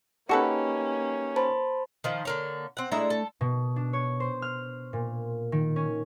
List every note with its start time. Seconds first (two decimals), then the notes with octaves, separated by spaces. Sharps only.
0.29 A#3 C#4 D#4 F#4 G4 A4 B4
1.36 C5 A5 B5
2.04 D#3 F3
2.25 D3 A#3 C#5
2.77 C4 F#5
2.92 G#3 A3 D4 E4 E5 A#5
3.10 A4
3.41 B2
3.76 D4
3.93 C#5
4.20 C5
4.42 F6
4.93 A#2
5.52 D#3
5.76 C#4